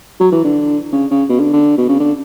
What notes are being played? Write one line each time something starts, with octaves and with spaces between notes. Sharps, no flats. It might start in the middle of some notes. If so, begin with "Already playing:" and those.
F#3
E3
D3
C#3
C#3
B2
D3
D3
B2
C#3
D3